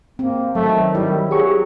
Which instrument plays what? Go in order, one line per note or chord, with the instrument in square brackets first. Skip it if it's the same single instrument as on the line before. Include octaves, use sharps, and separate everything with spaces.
[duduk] A#3 [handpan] C4
[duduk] D#3 [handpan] F#3 [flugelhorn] A3
[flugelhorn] G3 [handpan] E4
[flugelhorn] F#3 [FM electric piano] G4 G#4 C#6